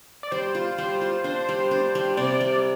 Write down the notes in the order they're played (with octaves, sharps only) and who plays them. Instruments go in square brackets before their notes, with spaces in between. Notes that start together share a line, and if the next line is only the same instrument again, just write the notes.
[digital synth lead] D5
[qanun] G3 [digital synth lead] C5
[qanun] F4
[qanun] G3 [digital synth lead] C5
[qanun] F4
[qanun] D4 [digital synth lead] C5
[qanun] G3
D4
G3
[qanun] C3 [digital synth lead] D5
[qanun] G3